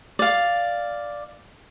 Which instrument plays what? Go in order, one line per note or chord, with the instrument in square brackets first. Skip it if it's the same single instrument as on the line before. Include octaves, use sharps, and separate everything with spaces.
[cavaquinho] D5 F5